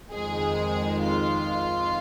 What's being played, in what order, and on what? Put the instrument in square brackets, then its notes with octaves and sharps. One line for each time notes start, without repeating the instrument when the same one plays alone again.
[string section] F2 D#3 G#3 G#4
F4